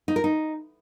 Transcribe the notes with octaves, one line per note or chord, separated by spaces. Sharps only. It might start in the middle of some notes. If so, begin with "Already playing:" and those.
D#4
A#4
D#4